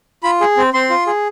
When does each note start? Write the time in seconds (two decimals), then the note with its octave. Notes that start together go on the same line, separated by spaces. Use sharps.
0.23 F4 B5
0.41 G#4
0.57 C4
0.74 C4 C6
0.90 F4
1.07 G#4